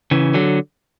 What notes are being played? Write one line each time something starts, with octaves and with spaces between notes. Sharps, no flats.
C#3 E3
D3 F#3